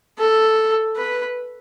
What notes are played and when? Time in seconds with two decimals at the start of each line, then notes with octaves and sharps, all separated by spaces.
0.18 A4
0.96 B4